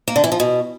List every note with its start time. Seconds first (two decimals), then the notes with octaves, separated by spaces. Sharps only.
0.08 A#3
0.16 D3
0.24 E3
0.32 F3
0.40 B2